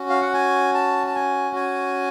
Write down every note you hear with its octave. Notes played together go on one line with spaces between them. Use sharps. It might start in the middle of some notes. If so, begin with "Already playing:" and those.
Already playing: C#4 F#4
F5
F#5
G#5
A5
A5
G#5
G#5